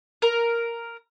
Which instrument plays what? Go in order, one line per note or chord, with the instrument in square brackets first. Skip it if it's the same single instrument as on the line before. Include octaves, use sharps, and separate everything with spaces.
[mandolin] A#4